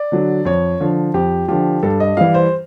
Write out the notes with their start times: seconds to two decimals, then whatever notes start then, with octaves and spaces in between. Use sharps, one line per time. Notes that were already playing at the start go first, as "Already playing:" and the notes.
Already playing: D5
0.12 D3 F#3
0.45 F2 C#5
0.80 D3 F3
1.14 F2 G4
1.48 D3 F3 G4
1.83 G2 A4
2.00 D#5
2.17 E3 G3 F5
2.34 C5